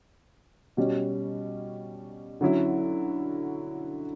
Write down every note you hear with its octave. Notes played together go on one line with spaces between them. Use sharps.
B2 G3 C#4
D3 F#3 C#4 E4